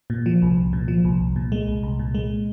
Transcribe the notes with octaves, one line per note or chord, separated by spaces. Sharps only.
A#2
F3
C2
C2
A#2
F3
C2
C2
A#2
G#3
C2
C2
A#2
G#3